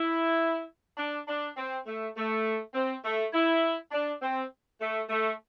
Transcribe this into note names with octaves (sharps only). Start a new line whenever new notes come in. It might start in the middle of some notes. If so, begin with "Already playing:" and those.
Already playing: E4
D4
D4
C4
A3
A3
C4
A3
E4
D4
C4
A3
A3